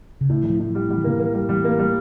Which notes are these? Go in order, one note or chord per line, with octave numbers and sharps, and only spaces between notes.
C#3
A2 D3
A2 E3
F3
A2
F3
G3
F3 G3
E3
D3 A#3
E3 A#3
G3
E3 G3
A#3
G3